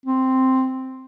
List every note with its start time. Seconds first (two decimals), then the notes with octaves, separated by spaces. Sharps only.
0.06 C4